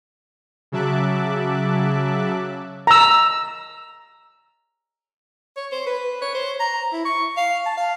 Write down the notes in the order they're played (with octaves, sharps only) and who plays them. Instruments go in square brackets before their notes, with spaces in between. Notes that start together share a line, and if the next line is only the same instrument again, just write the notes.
[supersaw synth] C#3 F#3 E5 A5 D6 F#6
[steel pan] A#5 E6
[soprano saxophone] C#5
C5
B4
C#5
C5
A#5
E4
C#6
F5
A5
F5